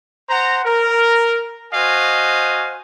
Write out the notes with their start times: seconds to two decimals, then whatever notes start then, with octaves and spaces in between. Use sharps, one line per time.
0.29 C5 F#5 A#5
0.65 A#4
1.74 F#4 C5 D#5 F5 G#5